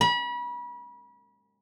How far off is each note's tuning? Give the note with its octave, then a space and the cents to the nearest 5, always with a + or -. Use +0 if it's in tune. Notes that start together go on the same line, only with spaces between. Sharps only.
B5 -35